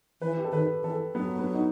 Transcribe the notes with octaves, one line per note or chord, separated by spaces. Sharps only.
E3 B4
G4
A4
D#3 B4
E3 A4
F#3 B3
B3
D#4